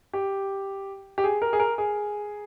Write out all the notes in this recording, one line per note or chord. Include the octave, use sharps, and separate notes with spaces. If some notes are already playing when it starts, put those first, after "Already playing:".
G4
G4
G#4
A#4
G#4
A#4
G#4